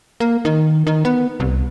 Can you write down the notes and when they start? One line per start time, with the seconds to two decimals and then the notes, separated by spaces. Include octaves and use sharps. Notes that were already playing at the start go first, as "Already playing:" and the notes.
0.20 A#3
0.45 D#3
0.87 D#3
1.05 B3
1.40 C2